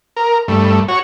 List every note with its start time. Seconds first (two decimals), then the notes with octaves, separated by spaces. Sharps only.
0.17 A#4
0.48 G2 A3
0.88 F#4 C#5